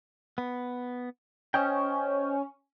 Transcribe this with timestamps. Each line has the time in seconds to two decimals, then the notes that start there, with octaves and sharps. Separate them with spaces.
0.38 B3
1.54 C#4 C5 D#5 G5